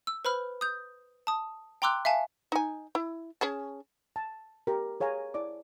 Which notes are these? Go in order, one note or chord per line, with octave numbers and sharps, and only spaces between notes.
E6
B4 C5 B5 F6
D#6 G6
A5 D#6
G5 A#5 C6 D6 E6 F#6
E5 F5 G#5 A5
D#4 G#5
E4
C#4 G#4 A5
A5
G4 A#4
G#4 C#5 F5 G#5 A#5
E4 D5 D6